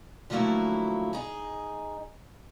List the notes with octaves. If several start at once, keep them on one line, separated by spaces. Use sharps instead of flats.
D3 F3 F#3 A3 A#3 E4
D#4 G#4